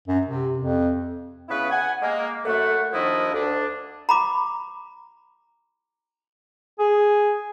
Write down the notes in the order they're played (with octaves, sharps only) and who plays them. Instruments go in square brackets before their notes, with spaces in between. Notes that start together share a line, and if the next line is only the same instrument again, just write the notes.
[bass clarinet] F#2
C3
F2
[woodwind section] C#3 B3 E4 B4
F#5 G#5
G#3 A#3
F#2 A3 F#5
D#2 D#3 F3 D4 E4 D#5
D2 D4
[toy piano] A#5 B5 D6
[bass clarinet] G#4